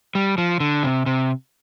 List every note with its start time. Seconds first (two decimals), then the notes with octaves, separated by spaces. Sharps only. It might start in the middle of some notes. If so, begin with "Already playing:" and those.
0.15 G3
0.38 F3
0.60 D3
0.83 C3
1.06 C3